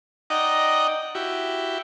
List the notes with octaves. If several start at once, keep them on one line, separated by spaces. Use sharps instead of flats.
D#4 D5 D#5 F#5 G5 A#5
E4 F#4 G4